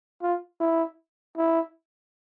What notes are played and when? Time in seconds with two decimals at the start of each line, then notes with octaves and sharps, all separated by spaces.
0.22 F4
0.60 E4
1.37 E4